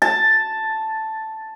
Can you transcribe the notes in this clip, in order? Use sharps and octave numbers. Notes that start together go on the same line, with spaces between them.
A5